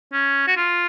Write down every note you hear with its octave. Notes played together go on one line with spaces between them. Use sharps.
C#4
F#4
F4